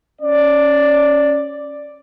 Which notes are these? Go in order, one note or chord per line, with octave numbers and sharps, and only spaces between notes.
C#4 D5